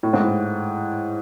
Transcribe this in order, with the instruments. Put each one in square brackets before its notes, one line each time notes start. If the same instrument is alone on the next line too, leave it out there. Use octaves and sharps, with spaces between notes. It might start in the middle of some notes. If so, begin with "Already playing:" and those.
[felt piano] A2
G#2
A2